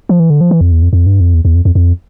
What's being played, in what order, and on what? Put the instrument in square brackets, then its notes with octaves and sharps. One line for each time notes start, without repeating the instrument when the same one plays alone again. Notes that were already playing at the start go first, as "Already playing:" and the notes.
[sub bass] F3
E3
D3
F3
E3
F2
E2
F2
F2
G2
F2
E2
E2
F2
F2
F2